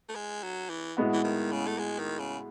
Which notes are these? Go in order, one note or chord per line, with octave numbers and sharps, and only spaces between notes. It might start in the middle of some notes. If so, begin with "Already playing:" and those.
A3
G#3
F#3
E3
A2 G#3 B3 F#4
E3
D#3
C#3
A3
G#3
D#3
C#3